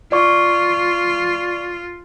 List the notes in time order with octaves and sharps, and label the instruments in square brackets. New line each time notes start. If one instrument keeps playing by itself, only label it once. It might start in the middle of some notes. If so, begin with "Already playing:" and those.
[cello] F4 [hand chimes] D5 C#6